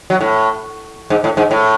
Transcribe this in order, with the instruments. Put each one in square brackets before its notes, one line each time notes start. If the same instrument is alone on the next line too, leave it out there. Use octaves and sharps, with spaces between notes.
[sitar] F#3
A2
G#2
A2
G#2
A2